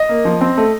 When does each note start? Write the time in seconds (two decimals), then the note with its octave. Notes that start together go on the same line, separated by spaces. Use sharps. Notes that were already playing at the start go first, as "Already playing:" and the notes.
Already playing: D#5
0.09 A#3
0.25 F3
0.41 C4
0.57 A3